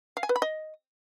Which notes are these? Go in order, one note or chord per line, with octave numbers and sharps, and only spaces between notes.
F5
G#5
B4
B5
D#5